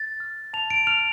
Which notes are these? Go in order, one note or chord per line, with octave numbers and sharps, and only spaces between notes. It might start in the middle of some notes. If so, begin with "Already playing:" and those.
Already playing: A6
F6
A5 F7
D7
F6 F7